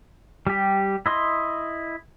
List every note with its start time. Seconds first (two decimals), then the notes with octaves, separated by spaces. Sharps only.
0.47 G3 G4
1.06 E4 D#5 C6